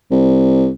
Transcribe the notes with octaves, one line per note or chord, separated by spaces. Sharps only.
C2